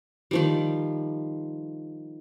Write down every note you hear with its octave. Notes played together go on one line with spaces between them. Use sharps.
D#3 F3 G3